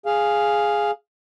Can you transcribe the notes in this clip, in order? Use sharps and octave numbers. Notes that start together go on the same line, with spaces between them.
G#4 F5